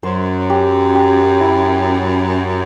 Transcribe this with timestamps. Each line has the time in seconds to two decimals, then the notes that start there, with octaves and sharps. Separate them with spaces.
0.03 F#2 C5
0.50 G4
0.95 G4
1.41 E4